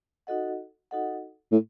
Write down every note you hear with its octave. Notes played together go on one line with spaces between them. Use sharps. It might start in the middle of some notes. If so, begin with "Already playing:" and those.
D#4 F#4 A4 D#5 F#5
D#4 F#4 A4 D#5 F#5
A2